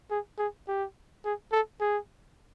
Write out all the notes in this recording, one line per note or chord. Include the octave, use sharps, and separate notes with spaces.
G#4
G#4
G4
G#4
A4
G#4